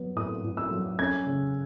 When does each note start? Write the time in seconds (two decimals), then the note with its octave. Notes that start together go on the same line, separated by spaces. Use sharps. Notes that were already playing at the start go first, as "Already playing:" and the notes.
Already playing: F#3 B3
0.16 A2 D#6
0.43 A2
0.57 E6
0.71 F#3
0.99 C#4 G#6
1.27 C#3